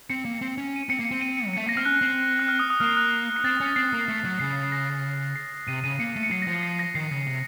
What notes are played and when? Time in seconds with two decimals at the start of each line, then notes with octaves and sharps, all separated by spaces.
0.10 C4 C#7
0.25 A#3
0.41 C4
0.58 C#4
0.76 D#7
0.89 C4 C#7
0.99 A#3
1.05 C#7
1.11 C4
1.21 D#7
1.37 C#7
1.47 F#3
1.53 A3 C#7
1.66 A#3 A#6
1.76 C4 F6
1.85 C#4 F#6
2.01 C4
2.39 F#6
2.48 F6
2.59 D#6
2.70 D#6
2.80 A#3 F6
2.97 F#6
3.44 C4 A6
3.60 C#4
3.76 C4 C7
3.93 A#3
4.08 A3
4.25 F#3
4.40 C#3 C7
4.72 A#6
5.36 C7
5.67 C3 D#7
5.84 C#3 D#7
6.00 A#3 C#7
6.16 A3
6.23 C#7
6.31 F#3 C7
6.42 A#6
6.47 F3 C#7
6.63 C7
6.79 A#6
6.95 D#3 C7
7.11 C#3
7.27 C3